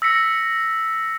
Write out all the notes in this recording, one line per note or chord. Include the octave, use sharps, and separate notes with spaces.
E6 A#6 B6 C#7